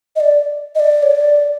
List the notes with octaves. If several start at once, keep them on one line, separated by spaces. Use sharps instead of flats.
D#5
D5
D#5
D5
C#5
D5